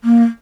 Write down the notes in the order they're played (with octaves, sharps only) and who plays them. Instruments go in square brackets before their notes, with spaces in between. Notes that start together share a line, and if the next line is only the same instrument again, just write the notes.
[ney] A#3